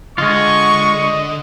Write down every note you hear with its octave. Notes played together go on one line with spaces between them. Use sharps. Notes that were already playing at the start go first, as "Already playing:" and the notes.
D3 G#3 F4 D#5 C#6